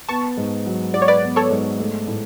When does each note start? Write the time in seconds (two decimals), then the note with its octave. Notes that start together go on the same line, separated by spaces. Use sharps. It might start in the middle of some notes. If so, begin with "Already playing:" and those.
0.09 B3 A5 C#6
0.37 G#2
0.66 F#3
0.94 F#4 D5
1.02 C#5
1.08 B4 D5
1.23 B3
1.36 A4 C#5
1.51 G#2
1.79 A3
2.07 A2